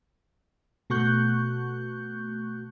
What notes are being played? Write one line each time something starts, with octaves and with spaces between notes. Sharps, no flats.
B2 A3 F#4 C#6 F#6 G6